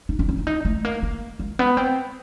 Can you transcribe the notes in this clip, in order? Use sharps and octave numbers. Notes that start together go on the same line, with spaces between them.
D#4
D4
C#4
D4
D#4
A3
A#3
A#3
G#3
B3
C4